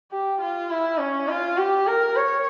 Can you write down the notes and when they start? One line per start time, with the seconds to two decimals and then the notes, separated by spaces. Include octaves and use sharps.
0.12 G4
0.41 F4
0.70 E4
0.99 C#4
1.29 F4
1.58 G4
1.87 A#4
2.16 C#5